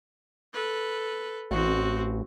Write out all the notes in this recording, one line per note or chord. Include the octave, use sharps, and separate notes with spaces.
A4 B4
A1 C4 F#4